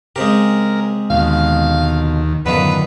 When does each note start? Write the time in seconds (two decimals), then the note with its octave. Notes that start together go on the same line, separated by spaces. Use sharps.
0.16 C#3 G#3 C4 G4 A#4
1.10 D#2 B2 D3 F5
2.46 F#2 A2 D3 D#3 B3 F4 B4